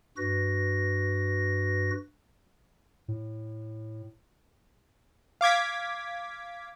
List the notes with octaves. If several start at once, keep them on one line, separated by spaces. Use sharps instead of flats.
G2 F#4 B4 A#6
A2
F5 D6 G#6 B6